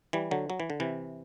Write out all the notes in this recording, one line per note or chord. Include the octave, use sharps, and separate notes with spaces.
E3 G3
D3 F#3
F#3
E3
D3
C3 E3